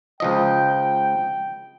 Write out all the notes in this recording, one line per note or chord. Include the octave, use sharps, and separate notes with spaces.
C#2 F3 D#5 G5